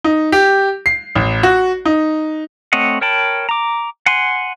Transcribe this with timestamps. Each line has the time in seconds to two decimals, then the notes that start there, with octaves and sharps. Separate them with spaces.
0.04 D#4
0.32 G4
0.86 C7
1.16 A1
1.43 F#4
1.85 D#4
2.73 A3 C4 C#5 D#5 F#5
3.01 A#4 C#5 G5 A5 B5
3.49 A#5 D6
4.06 F#5 G#5 C6